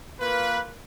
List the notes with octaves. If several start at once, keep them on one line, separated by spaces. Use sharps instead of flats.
A#3 F4 B4